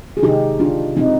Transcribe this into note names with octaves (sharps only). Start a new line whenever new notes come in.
G#4
C3 D#3 G#3 D#4 G4
D4 F4
B2 G#3 C4 D#4